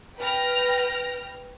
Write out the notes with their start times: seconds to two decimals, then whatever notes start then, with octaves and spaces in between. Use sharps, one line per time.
0.18 B4 G5 F6 A#6